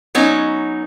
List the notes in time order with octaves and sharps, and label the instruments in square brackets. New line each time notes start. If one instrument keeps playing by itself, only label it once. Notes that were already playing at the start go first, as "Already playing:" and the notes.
[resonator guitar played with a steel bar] F#3 B3 C#4 D#4